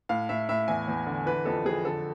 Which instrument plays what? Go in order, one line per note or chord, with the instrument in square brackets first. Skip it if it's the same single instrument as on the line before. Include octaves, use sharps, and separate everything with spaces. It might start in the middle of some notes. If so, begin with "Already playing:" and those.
[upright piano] A2 F5
A2 E5
A2 E5
E2 G#5
E2
D3
E3 B4
F2 A4
F2 G#4
D3 A4